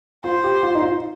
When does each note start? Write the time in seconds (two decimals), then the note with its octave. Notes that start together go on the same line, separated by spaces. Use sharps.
0.24 F4 C5
0.44 G4
0.63 F4
0.75 D#4
0.82 F4